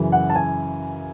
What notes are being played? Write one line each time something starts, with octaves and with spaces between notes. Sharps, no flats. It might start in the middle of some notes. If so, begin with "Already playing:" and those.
Already playing: F#2 C#3 E3
F#5
A5
G#5